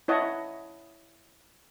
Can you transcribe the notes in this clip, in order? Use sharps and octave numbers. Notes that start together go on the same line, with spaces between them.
E4 C#5 D#5 F#5 A5